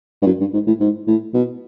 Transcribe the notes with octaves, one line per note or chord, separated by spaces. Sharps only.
G2
F#2
G2
G#2
A2
G#2
A2
B2